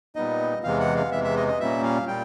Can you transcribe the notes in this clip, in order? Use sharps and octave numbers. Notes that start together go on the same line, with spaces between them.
A#2 G3 B3 D#4 D#5
E2 C3 E3 G#3 F5
F#5
F5
E2 C3 E3 G#3 E5
E5
D#5
D#5
A#2 G3 A#3 C#4 E5
F5
A#2 G3 G5